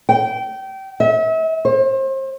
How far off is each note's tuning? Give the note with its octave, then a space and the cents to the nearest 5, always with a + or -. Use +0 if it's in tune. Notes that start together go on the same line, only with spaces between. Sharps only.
G5 -25
E5 -40
C5 +35